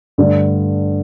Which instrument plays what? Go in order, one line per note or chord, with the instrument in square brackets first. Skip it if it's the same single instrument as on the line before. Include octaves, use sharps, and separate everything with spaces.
[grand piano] G2 D3 A3